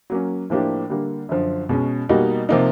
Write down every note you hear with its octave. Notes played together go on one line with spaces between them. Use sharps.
F#3 A#3 C#4
A2 F3 A#3 D4 G4
D3 G3 A#3
F#2 D3 F3
B2 G#3 C#4
B2 G3 A#3 D#4 F#4
C3 F3 A#3 D#4